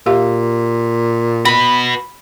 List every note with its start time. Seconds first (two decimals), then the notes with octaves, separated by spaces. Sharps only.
0.06 A#2 G4 E5 F5
1.45 F#4 B4 B5